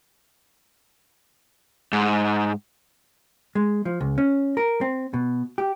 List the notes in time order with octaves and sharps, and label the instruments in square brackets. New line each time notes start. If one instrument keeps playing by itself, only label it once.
[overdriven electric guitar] G#2
[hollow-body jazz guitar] G#3
F3
C#2
C#4
A#4
C4
B2
G4